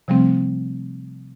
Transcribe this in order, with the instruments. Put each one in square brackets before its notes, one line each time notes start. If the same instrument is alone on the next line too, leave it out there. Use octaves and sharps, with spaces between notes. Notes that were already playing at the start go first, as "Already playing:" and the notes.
[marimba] C3 F3 G3 A3 C4